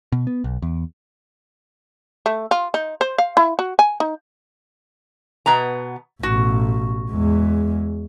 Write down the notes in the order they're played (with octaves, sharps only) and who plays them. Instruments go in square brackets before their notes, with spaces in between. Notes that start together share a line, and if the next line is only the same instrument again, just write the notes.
[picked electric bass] B2
B3
B1
E2
[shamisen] A3
F4
D#4
C5
F5
E4
F#4
G#5
D#4
[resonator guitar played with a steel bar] B2 B3 A#5
[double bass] A1 B2 [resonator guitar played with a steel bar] F#4
[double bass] E2 G#3